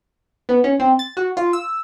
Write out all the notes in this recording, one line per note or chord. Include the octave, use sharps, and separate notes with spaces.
B3
C#4
C4
A6
F#4
F4
E6